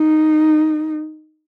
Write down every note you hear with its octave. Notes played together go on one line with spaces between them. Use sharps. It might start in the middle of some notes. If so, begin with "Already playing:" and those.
Already playing: D#4